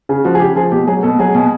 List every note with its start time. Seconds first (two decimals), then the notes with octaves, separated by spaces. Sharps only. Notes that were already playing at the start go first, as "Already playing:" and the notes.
0.09 C#3 G#4
0.25 F3 F#4
0.35 G#4
0.40 C#3 G4
0.56 F3 G#4
0.72 B2 G4
0.87 F#3 G#4
1.03 B2 A4
1.19 F#3 G#4
1.35 B2